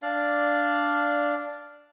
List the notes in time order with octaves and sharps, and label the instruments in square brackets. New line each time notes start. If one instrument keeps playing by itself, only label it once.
[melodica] D4 D5 F5